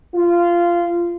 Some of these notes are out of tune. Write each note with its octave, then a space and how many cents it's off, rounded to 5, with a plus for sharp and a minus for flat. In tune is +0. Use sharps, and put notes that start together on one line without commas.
F4 -15